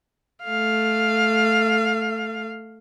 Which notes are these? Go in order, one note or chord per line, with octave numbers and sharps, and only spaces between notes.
A3 F5